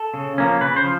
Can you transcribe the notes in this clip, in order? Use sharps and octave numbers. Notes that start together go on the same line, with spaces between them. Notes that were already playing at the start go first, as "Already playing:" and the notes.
Already playing: A4
C#3
F3 A#3 C#4
C#3 B4
C5
F3